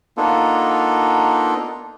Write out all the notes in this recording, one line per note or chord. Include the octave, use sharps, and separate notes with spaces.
A#3 B3 D4 D#4 F4 A4